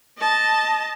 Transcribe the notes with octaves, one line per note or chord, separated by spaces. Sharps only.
D#5 A5